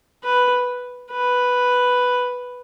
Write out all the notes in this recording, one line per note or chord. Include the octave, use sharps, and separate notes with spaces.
B4
B4